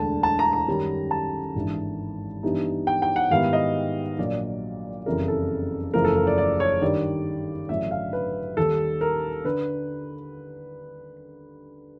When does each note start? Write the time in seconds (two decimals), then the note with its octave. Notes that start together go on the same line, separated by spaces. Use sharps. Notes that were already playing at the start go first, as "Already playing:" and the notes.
Already playing: E1 D2 D3 A5
0.23 A5
0.39 A#5
0.53 A#5
0.68 F#2 D#3 G3
1.11 A5
1.55 G#1 G2 E3
2.43 G2 E3 G3 B3 D#4
2.87 G5
3.02 G5
3.16 F#5
3.30 G#2 D#3 G3 B3 E4 F5
3.53 D#5
4.18 A#1 A#2 F#3 D5
5.06 F#1 F2 C#3 E3 G3 A#4
5.28 A4
5.94 F#1 E2 C#3 F3 A3 A#4
6.05 A4
6.16 A#4
6.27 D5
6.38 D5
6.60 C#5
6.81 G2 D#3 G3 D5
7.69 A1 G2 D3 F#3 E5
7.91 F5
8.13 B4
8.57 D#2 D#3 G3 A4
9.01 A#4
9.44 D3 B4